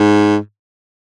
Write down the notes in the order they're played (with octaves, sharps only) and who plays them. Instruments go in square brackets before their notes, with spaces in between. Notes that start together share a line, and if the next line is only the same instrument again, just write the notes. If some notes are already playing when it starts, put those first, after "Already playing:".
Already playing: [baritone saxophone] G#2